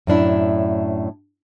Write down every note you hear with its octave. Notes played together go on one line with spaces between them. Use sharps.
F#2 A2 D4 E4